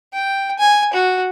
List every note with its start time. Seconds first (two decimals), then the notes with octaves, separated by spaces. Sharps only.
0.13 G5
0.59 G#5
0.94 F#4